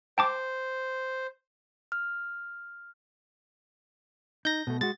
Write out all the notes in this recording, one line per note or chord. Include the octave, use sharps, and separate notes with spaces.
C5 G5 A5 D6
F6
D#4 G6 A#6
B2 A3
G#3 F#4 A6